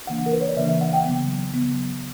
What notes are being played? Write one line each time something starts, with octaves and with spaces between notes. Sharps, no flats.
C#3 E3 A#3 D4 F#5
A#4
B4
C#5
D5
C#3 E3 A#3 D4 E5
E5
F#5
G5
C#3 F#3 B3
C#3 F#3 B3